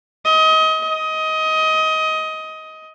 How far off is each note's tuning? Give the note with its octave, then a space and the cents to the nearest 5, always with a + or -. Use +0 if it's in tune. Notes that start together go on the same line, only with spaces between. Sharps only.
D#5 +30
D#5 +20